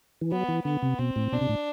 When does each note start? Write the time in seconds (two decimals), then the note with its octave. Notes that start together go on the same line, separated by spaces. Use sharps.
0.21 E3
0.32 F#3 B3
0.48 E3
0.65 D3 B3
0.82 C3
0.99 B2 C4
1.16 A2
1.32 B2 D4
1.41 C3
1.49 A2